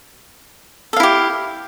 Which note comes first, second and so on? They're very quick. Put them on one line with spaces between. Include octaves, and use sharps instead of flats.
A4 F5 E4 G4